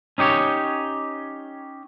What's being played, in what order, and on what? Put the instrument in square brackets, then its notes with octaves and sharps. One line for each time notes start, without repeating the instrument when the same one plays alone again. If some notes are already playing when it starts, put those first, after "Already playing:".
[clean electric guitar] C#4 D#4 G4 C#5